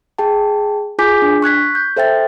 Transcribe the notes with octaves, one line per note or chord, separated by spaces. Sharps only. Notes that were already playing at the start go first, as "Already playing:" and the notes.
G#4 G5 A5
F4 G#4 G#5 D6 G6 B6
D4
C#6 F#6 G#6 B6
G6
A4 C5 E5 G5 A6